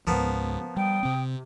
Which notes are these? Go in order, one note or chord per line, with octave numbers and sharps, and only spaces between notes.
C#2 G#2 F3 A#3 B3
G3 G5 D#6
C3 C4